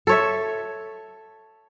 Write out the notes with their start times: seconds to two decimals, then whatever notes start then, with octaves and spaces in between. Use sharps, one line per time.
0.07 A4 C#5 E5